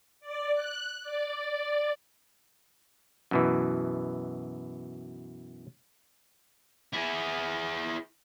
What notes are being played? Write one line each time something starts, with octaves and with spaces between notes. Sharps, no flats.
D5
F#6
D5
F#2 B2 E3
E4 G#4